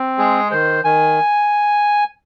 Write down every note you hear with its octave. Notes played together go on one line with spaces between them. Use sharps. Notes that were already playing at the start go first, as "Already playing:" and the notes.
Already playing: C4
G#3 G#4
D#3 C5
D#3 G#5